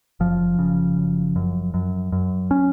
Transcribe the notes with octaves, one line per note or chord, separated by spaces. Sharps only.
F#1 F3
C#3
F#1
F#2
F#2
F#2
C#4